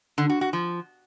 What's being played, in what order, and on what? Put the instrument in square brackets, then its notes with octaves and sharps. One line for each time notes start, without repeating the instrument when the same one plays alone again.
[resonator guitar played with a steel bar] D3
F#4
F#4
F3